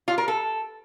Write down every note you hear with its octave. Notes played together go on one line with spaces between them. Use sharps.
F4
A#4
A4